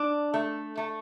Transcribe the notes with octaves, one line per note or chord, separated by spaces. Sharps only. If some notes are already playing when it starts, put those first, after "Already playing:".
Already playing: D4
A3
A3